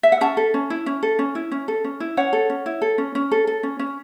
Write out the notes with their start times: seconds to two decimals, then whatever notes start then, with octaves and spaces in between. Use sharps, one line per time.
0.03 E5
0.12 F#5
0.21 C#4 E5 A5
0.37 A4
0.54 C#4
0.70 E4
0.86 C#4
1.03 A4
1.19 C#4
1.35 E4
1.51 C#4
1.68 A4
1.84 C#4
2.00 E4
2.17 C#4 C#5 F#5
2.33 A4
2.50 C#4
2.66 E4
2.82 A4
2.98 C#4
3.15 C#4
3.31 A4
3.47 A4
3.63 C#4
3.79 C#4